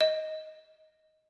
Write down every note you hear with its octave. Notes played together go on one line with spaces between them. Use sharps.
D#5